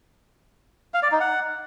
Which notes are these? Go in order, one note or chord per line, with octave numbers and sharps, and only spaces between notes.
F5
D5
D#4
F#5